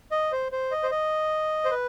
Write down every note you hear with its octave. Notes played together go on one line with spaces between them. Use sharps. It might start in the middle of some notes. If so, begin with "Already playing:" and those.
D#5
C5
C5
D#5
C5
D#5
C5
B4